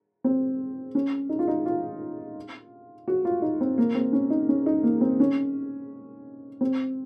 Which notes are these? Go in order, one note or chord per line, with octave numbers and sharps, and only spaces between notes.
C4
C#4
D#4
F4
D#4
F4
F#4
F4
D#4
C4
A#3
C4
C#4
D#4
C#4
D#4
A#3
C4
C#4
C4